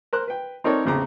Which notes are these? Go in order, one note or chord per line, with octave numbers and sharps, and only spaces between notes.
A#4 C5 F#6
B4 G5
C4 D#4 A4 A#4 C#5 D5
A1 E2 C#3 C4 A#5 D6